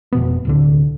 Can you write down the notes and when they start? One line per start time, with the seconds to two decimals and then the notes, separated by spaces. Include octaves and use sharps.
0.12 F1 B2 B3
0.45 D1 C2 D3